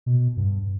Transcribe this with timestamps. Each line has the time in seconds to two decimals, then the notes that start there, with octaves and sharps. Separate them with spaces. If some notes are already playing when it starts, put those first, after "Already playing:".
0.06 B2
0.37 G2